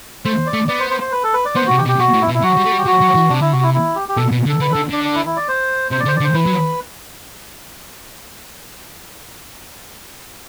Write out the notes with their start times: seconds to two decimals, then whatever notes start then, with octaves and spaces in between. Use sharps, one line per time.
0.25 A3 C5
0.46 D5
0.53 A3
0.68 B3 D5
0.79 C5
0.90 C5
1.01 C5
1.12 B4
1.23 A4
1.34 B4
1.45 D5
1.55 B3 C5
1.67 C3 F#4
1.77 G4
1.85 B2
1.88 G4
1.99 B2 F#4
2.13 A2
2.21 E4
2.28 B2
2.34 E4
2.43 F#3 F#4
2.57 G3
2.65 A3
2.72 G3
2.78 G4
2.86 F#3 F#4
3.01 F#3
3.15 E3
3.29 C3 D4
3.41 D3 E4
3.52 C3 F#4
3.63 E4
3.74 E4
3.96 G4
4.09 G4
4.16 B2 A4
4.31 B2
4.46 D3
4.49 A4
4.60 D3 B4
4.72 D3 A4
4.90 D3 D4
5.04 D4
5.15 E4
5.26 E4
5.37 D5
5.48 C5
5.91 C3 C5
6.00 D5
6.05 D3 C5
6.16 D5
6.20 D3
6.24 C5
6.34 E3 B4
6.46 F#3